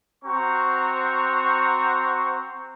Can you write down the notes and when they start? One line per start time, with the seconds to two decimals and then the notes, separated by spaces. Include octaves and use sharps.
0.24 C4 F#4 C5 A#5 C#6